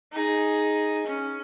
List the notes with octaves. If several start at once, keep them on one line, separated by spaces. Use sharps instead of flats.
D#4 G#4
C#4